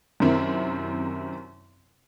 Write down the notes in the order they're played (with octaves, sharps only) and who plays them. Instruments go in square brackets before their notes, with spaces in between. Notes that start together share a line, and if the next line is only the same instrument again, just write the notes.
[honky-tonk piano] F#2 C3 D#3 C4 E4